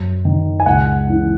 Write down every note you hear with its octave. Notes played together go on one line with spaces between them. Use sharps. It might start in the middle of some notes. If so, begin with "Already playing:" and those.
Already playing: F#2
D#3
G#5
C#2 F#5
C#3 E3